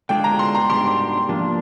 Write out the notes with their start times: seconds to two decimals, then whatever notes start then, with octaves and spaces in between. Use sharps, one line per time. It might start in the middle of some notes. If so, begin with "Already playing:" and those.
0.09 D3 G#3 D4 F4 G#4 G5
0.24 A#5
0.39 C6
0.55 A#5
0.70 G#2 G3 D4 G4 C6
1.29 F3 A#3 D4